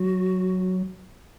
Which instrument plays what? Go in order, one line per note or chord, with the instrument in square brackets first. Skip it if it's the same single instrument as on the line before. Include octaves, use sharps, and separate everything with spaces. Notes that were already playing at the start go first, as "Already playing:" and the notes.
Already playing: [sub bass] F#3 [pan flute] F#4